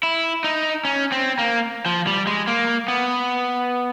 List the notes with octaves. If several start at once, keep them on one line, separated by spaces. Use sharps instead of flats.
E4
D#4
C#4
C4
A#3
F3
G3
G#3
A#3
B3